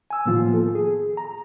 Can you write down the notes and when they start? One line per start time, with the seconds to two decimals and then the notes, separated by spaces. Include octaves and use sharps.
0.10 G#5 E6
0.26 A2 D#3 F3 A#3 B3 F4
0.54 A4
0.75 G#4
1.17 A#5